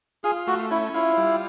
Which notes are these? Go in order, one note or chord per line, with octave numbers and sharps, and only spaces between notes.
F4 G#4
A3 F#4
C#4 E4
E4 F4
G3